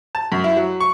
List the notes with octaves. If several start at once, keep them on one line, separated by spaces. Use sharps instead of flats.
A5
F#2
E4
F#3
C#6